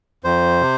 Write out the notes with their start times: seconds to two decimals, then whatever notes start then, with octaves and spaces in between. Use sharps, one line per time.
0.24 F2 C5
0.62 C3